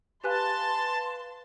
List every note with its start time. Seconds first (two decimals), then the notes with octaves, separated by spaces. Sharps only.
0.24 G4 B4 F5 G#5 A5 C6 F#6